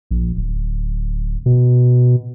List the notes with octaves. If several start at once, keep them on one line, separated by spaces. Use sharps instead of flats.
A#1
D1
B2